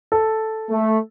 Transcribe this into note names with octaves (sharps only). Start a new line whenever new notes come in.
A4
A3